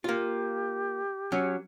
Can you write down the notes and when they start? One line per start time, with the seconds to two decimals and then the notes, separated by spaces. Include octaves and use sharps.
0.04 A#3 F4 G4
1.32 F#3 C#4